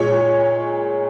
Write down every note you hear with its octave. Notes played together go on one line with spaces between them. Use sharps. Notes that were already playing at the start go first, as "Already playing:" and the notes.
Already playing: A#2 G#3 C#5